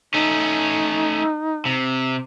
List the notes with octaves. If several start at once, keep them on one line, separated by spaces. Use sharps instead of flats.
A3 C#4 D#4
C3